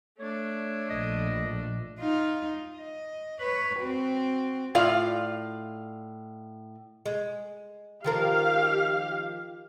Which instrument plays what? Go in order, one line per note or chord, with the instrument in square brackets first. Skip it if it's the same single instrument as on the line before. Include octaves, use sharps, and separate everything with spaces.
[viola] A3 D4 [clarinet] C#5
[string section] A#1 [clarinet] D#5
[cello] D#4 F4
D#5
B4 C#5
C4 F#4
[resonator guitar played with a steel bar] A2 F4 D5 F5
[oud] G#3
[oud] D#3 F3 A#4 [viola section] G4 F5